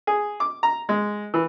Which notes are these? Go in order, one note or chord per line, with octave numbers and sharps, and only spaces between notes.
G#4
D6
A#5
G#3
E3